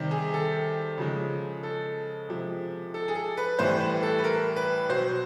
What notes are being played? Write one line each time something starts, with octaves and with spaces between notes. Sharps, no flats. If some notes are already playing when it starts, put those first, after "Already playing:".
Already playing: C3 D#3 G3
G#4
A4
C#3 F3 G#3
A4
C3 F3 G#3
A4
G#4
A4
B4
A2 E3 G3 C5
B4
A4
B4
A#4
B4
B2 F#3 C5